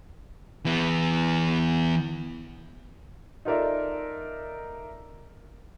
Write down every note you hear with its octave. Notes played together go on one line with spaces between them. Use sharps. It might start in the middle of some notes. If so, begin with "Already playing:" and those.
E3 B3
D#4 F4 A4 A#4 D5 E5